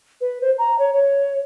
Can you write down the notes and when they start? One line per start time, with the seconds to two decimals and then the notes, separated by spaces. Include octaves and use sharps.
0.21 B4
0.42 C5
0.58 A#5
0.79 C#5
0.94 C#5